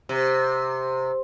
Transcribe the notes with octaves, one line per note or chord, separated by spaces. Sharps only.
C3